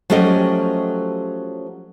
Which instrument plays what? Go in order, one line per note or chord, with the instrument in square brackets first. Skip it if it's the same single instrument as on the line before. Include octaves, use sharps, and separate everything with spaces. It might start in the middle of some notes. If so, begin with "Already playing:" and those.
[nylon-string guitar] F3 F#3 A3 C#4 G4 D#5